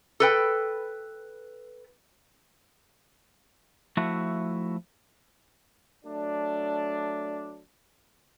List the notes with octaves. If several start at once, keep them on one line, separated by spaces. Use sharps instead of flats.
A4 B4 G5
F3 A3 E4 F#4
F#3 A3 D4